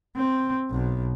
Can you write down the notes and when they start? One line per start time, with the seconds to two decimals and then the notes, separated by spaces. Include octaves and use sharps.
0.17 C4
0.71 B1 B2